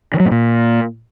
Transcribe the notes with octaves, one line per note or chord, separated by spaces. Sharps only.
D#3
F#3
A2
A#2